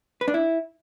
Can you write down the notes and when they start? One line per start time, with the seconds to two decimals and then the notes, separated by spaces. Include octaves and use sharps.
0.21 B4
0.28 D4
0.34 E4